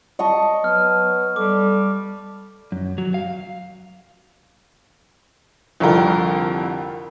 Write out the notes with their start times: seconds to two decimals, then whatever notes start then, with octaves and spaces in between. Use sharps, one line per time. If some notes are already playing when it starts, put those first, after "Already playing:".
0.19 D#5 A5 C#6
0.64 F#3 B3 F6
1.36 G3 A4 D6
2.72 F#2
2.98 F#3
3.14 F5
5.80 C2 F2 D3 F4 A#4 G5